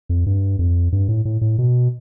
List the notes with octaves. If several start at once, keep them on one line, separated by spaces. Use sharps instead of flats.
F2
G2
F2
G2
A2
A2
A2
B2